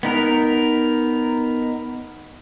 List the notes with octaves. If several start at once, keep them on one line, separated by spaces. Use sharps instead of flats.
B3 D#4 A#4